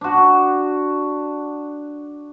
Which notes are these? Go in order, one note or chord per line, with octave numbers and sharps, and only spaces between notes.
D4 F#4